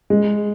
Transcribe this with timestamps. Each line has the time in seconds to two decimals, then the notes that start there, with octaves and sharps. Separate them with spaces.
0.10 G#3